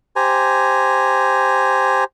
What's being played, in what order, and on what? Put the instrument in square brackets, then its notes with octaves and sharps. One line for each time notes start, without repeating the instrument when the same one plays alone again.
[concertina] G4 C5 G#5 A#5